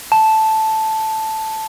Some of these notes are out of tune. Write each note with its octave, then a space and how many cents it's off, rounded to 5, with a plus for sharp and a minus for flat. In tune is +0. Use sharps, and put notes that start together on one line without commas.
A5 -5